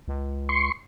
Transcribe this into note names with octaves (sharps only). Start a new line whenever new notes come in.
C#2
C6 C#6